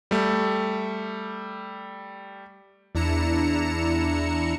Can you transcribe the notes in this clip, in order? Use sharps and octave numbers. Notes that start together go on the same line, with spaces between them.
G3 A3
E2 D4 E4 A#5 C#7 E7